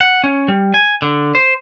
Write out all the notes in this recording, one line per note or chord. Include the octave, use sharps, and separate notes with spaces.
F#5
C#4
G3
G#5
D3
C5